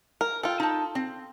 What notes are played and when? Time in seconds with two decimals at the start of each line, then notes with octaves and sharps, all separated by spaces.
0.21 A#4
0.43 F4 A4 G5
0.60 D#4 A5
0.95 C4